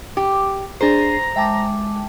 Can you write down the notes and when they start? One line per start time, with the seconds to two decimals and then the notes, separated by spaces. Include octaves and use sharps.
0.17 G4
0.81 D4 G#4 C5 A#5 C7
1.36 G#3 E5 G5 A5 D6